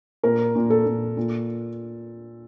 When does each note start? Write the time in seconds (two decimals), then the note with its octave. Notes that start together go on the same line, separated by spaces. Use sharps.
0.23 A#2 A#4
0.55 A#2
0.70 A4
0.85 A#2
1.17 A#2